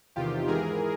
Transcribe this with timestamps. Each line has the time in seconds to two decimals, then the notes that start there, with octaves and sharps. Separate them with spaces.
0.16 E2 C3 D#3 F4 G4
0.47 G#2 E3 G#4 A#4